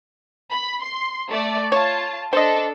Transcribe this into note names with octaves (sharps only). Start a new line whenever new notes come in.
B5
C6
A3 D5
F4 C#5 A5
D4 A4 C5 D#5